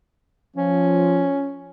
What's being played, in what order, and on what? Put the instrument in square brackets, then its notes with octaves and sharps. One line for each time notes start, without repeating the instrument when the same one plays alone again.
[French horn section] F3 [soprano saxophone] C#4